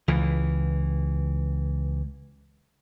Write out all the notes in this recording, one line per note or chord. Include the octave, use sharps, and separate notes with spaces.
C#2 E3